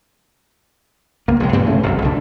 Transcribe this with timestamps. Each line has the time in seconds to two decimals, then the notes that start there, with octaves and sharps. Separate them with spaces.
1.28 C#2 A#3 B3
1.40 A#1 C3 G#3
1.53 G2 A#2 C4
1.66 C#3 E3 A3 C#4
1.83 F#1 C2 G2
2.02 C#2 B2 F#3 D4